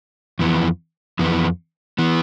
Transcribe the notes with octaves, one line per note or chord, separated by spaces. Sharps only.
F2 E3 B3
F2 E3 B3
E3 B3